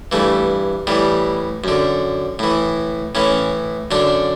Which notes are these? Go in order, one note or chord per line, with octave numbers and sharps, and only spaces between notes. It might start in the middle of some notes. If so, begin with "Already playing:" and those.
G2 E3 A3
A2 E3 G3
F#2 D3
A2 E3
A2 E3 C#4
F#2 D3 D4